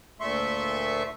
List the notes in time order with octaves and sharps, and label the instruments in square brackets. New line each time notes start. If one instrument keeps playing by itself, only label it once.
[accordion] D2 A#2 A3 E5 C6 C#6